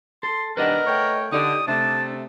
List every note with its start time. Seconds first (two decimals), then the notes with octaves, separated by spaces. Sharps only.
0.23 A4 C6
0.57 D#3 G3 D4 A#4 B4 D#5 F#5
0.87 A3 C#5 G5
1.32 D3 D#4 G4 D5 D#6
1.68 C3 A3 D4 A5